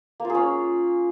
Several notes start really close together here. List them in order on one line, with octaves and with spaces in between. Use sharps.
A#3 F4 G#4 C#4